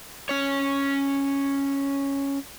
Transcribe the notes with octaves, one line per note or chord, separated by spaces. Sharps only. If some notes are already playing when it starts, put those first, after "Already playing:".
C#4 C#5